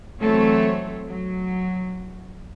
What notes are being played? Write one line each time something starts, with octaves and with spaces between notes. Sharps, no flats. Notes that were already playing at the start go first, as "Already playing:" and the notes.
E3 F#3 A3 C4 A4 C#5
F#3